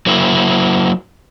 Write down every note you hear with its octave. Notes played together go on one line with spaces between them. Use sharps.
F#3 A#3 E4